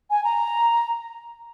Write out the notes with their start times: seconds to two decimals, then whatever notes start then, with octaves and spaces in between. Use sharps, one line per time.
0.10 G#5
0.24 A#5